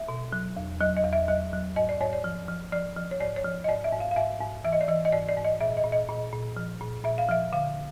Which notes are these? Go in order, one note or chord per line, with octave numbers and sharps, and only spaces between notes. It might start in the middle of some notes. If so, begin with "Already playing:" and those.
Already playing: E5
B2
F#3
E2
F#3 D#5
D#5
E2
E5
F#3 D#5
F#3
G#2 D#5
D5
G#2 C#5
D5
F3
F3
F3 D5
F3
C#5
G#2 D5
C#5
F3
D#5
G#2 D5
E5
G#2
F5
F5
G#2 E5
G#2
E3 E5
D#5
D5
E3 D#5
D#5
G#2 D5
D5
G#2
D#5
A#2 E5
D#5
A#2
D#5
A#2
A#2
F3
A#2
A#2 E5
F5
F3 E5
D3 F5